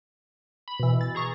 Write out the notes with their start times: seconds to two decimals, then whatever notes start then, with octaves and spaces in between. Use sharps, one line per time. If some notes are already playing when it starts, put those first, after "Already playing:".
0.68 B5
0.80 B2 E3
1.01 A6
1.15 G#4 A#5 C#6